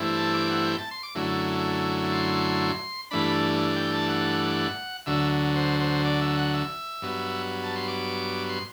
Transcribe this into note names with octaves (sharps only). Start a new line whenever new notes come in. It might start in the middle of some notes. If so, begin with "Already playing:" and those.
Already playing: G2 E3 A3 C4 E4
A5
D6
F#5
G5
A5
C6
D6
F#2 D3 F#3 A3 E4
C6
G2 E3 A3 D4 B5
G5
A5
F#5
D2 D3 F#3 E5
C5
C5
D5
E5
F#5
E5
G2 F#3 B3
A5
C6
D6
C6